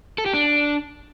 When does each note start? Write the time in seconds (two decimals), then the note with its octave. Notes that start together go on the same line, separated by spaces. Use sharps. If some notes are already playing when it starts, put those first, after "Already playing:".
0.18 A4
0.26 G4
0.33 D4